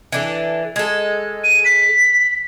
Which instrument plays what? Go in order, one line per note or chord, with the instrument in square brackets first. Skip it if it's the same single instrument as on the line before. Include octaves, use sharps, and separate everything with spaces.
[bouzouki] E3 D4 A4
G#3 A4
[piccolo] D#7
B6